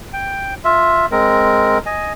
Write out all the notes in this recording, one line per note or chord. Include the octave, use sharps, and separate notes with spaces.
G5
F4 E5
G#3 C4 A#4
D#5 G#5